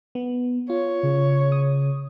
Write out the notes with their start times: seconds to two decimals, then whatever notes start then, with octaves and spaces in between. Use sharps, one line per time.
0.15 B3
0.70 F4 C#5
1.03 C#3
1.52 D#6